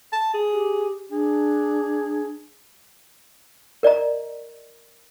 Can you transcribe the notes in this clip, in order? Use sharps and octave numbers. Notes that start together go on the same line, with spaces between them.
A5
G#4
G4
D4 G#4
A#4 D5 D#5 A#5